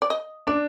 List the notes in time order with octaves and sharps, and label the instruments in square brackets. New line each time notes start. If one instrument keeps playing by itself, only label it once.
[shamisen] D5
D#5
[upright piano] D4 [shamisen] D5